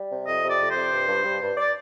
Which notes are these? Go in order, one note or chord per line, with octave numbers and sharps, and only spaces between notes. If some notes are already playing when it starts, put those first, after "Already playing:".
Already playing: G3
C3
F2 D#5
C3 D5
F2
C5
C3
G2
G2
G2
G2
D5